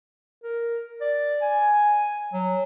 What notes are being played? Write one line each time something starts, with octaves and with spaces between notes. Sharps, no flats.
A#4
D5
G#5
F#3